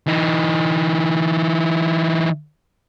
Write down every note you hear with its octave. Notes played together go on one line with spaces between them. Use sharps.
E3 D#4